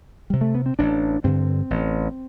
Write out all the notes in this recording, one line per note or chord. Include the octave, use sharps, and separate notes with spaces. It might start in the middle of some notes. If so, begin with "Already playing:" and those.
C3 G3
A3
B3
C4
A1 D4
G2 D3 C4
A1